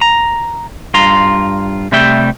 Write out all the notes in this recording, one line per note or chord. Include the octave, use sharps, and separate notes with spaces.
A#5
G2 F4 A#5 C6
C3 G3 A3 E5 G5